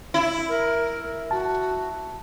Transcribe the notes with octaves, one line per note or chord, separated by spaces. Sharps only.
E4
A#4
F#4 A5